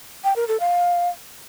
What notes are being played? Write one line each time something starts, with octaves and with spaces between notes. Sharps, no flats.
G5
A#4
A4
F5